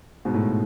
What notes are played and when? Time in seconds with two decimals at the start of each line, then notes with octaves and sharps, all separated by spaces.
0.25 G#2 B2
0.34 A2